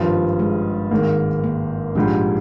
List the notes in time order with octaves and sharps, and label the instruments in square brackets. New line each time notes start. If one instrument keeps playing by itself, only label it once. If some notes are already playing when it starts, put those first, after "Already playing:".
Already playing: [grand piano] G#1 G2 F3
[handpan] G3
G#3
[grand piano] G#1 G#2 D#3 A#3
[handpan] A#3
[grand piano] A#1 G#2 G3 [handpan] D4